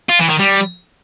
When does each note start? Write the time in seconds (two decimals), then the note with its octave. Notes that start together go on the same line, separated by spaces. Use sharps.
0.09 F4
0.20 E3
0.30 D#3
0.40 G3